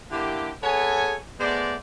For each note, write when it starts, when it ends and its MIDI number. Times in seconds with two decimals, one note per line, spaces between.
0.11 0.51 50
0.11 0.51 58
0.11 0.51 64
0.11 0.51 67
0.63 1.16 59
0.63 1.16 68
0.63 1.16 69
0.63 1.16 73
0.63 1.16 80
1.40 1.75 56
1.40 1.75 57
1.40 1.75 59
1.40 1.75 72
1.40 1.75 74